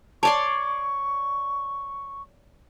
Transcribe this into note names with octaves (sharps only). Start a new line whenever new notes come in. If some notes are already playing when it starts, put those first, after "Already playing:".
C#5 D5 A5 C6 C#6